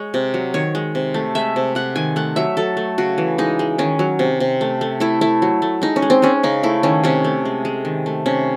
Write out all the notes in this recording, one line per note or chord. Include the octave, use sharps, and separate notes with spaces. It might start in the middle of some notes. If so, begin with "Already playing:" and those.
Already playing: G#3 C#5
C3
F#3
D#3 C#5
G#3
C3
A3
G#3 E5
C3
C3 F#5
D#3 G#5
A3 F#5
F#3 E5
F#3 A4
A3
C#3 F#4
E3
G#3 D#4
G#3
D#3 C#4
F#3
C3
C3
A3
A3
A3 E4
A3 E4
F#3
A3
G#3 D#4
C#4
G#3
C4
G#3 C#4
C#3 D#4
A3 E4
D#3 C#4
C3 C#4
A3
G#3
G#3
D#3
A3
C3 C#4